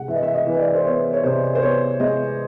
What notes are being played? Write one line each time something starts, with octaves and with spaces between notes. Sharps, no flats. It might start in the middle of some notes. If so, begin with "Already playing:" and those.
Already playing: C3 G#3 F#5
E3 E5
D#5
E5
D#5
E3
D#5
D5
C5
B3 C#5
C#5
C3 C5
C5
B3 C#5
G#3 D#5